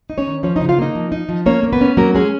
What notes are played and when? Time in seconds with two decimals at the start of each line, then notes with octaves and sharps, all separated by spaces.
0.10 D#4
0.18 C#4 C#5
0.27 D#3
0.43 F3 C#4 C#5
0.56 C#3 D#4 D#5
0.69 F4 F5
0.78 A#3 D#4 D#5
0.95 F3
1.12 D#4
1.29 F3
1.46 A#3 C#4 C#5
1.63 A#3
1.73 B3 B4
1.81 C#4
1.97 F#3 A#3 A#4
2.14 G#3 C#4 G#4